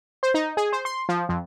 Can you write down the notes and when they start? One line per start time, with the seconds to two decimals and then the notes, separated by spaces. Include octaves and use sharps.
0.23 C5
0.34 D#4
0.57 G#4
0.73 C5
0.85 C6
1.09 F3
1.29 F2